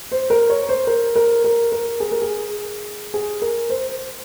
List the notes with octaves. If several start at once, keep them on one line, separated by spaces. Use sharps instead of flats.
C5
A#4
C#5
C5
A#4
A#4
A#4
A#4
G#4
A#4
G#4
G#4
A#4
C5